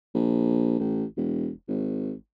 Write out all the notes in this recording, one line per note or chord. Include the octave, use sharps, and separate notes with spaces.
A#1
A1
E1
G#1